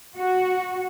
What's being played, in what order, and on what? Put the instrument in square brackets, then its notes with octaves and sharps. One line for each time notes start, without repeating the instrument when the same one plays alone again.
[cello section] F#4